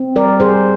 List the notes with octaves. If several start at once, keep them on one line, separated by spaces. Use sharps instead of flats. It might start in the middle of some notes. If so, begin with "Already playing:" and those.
Already playing: C4
G3 A#4 D5
G3 G#4 C5